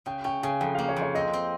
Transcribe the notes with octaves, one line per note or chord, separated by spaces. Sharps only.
C#3 G5
C#4 G5
C#3 G#5
F2 G5
A#3 F5
C#5
F2
C#5
C4 D#5
C4